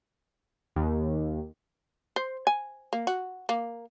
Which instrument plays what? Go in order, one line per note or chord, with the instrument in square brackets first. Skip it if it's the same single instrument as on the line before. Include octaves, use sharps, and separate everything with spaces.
[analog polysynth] D#2
[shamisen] C5
G#5
A#3
F#4
A#3